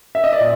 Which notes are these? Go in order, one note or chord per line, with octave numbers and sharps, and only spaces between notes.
E5
D#5
D5
A#2